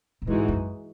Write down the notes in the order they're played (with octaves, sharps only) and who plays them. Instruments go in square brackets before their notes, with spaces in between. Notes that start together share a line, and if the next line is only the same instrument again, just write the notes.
[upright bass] A#2
[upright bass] G#2 [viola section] E3 G#3 D#4 F#4
[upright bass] F#2